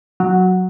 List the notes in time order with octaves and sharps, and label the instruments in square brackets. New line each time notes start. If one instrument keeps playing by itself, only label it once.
[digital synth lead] F#3